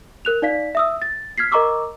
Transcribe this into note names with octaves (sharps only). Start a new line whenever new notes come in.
A#4 F#6 F7
D#4 D5 F5 B6
E5 D#6 E6
A6
F6 G#6 B6 C7
A#4 D#5 A#5 C#6 D6 E6